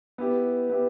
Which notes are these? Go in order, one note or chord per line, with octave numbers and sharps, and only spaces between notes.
B3 E4 G4
B3 E4 G4